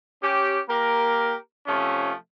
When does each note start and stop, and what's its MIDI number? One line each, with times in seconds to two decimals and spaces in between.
0.22 0.59 61
0.22 0.59 67
0.69 1.35 58
0.69 1.35 67
0.69 1.35 70
1.67 2.12 48
1.67 2.12 53
1.67 2.12 57
1.67 2.12 61
1.67 2.12 65